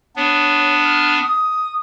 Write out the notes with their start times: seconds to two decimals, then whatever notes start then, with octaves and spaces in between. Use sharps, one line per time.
0.16 B3 D4 C#5
0.84 F6
1.22 D#6